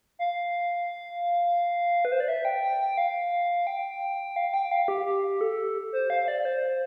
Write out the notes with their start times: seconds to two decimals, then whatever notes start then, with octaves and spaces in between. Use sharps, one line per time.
0.19 F5
2.05 B4
2.12 C5
2.20 D5
2.28 E5
2.45 G5
2.63 G5
2.80 G5
2.98 F5
3.67 G5
4.36 F5
4.54 G5
4.71 F5
4.88 G4
5.06 G4
5.41 A4
5.93 C5
6.10 F5
6.28 D5
6.45 C5